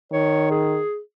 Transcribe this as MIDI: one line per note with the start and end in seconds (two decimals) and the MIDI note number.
0.12 0.81 51
0.12 0.49 73
0.51 0.99 68